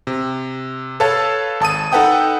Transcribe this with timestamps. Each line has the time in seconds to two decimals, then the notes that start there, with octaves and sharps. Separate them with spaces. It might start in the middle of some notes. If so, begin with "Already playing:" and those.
0.07 C3
1.00 A4 B4 C#5 F5 A5
1.60 G#1 A5 D#6 D#7
1.92 D#4 A4 B4 F#5 G5 D#6